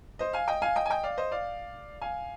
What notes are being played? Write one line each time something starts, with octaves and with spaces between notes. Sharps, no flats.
C5 D#5
F5 G#5
D#5 G5
F5 G#5
D#5 G5
G#5
D#5 G5
D5 F5
C5 D#5
D5 F5
F5 G#5